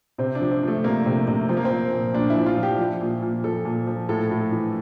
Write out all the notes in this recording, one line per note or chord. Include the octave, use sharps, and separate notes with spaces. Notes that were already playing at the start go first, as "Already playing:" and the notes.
C3 C4
D4
F3
C4
F3 A3
C3 A#3
C3
C3
F3 C4
A#3
C4
F3
A#2
A#2 D4
E4
F3
F4
F3
G4
F3
A#2
A#2
F3 A4
A#2
F3
A2 A4
A2
E3